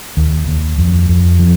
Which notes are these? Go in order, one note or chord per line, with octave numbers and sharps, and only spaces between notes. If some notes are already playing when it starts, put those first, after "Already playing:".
D#2
D#2
F2
F2
F3